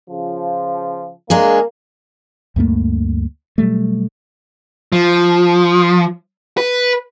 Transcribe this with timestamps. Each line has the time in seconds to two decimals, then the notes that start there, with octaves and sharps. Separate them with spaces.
0.10 C#3 F3
1.30 G#3 A#3 D4 G#4
2.56 D2 G2 A3 A#3
3.58 B2 F#3 G3 A3
4.92 F3
6.58 B4